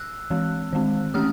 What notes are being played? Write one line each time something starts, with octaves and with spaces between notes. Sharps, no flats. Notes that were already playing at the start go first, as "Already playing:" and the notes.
Already playing: E6 F#6
E3 G#3 C4
D#3 G#3 C4
E3 A3 C#4 D#6 F6